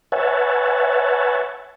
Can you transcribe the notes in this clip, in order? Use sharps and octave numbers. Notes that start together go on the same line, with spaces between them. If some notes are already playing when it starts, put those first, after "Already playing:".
B4 C#5 E5 F#5 G#5 A5